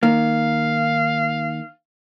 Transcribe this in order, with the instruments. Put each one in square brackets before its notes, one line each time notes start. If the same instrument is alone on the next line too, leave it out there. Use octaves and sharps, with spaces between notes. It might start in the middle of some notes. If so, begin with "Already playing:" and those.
[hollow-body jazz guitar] D#3 A#3 [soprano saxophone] F5